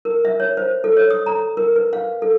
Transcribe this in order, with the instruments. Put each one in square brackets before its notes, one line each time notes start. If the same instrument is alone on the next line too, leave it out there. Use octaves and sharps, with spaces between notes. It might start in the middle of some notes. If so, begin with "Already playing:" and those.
[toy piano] A#4
E5
C#5
C5
A4
C#5
D#6
A#5
A#4
B4
F5
A4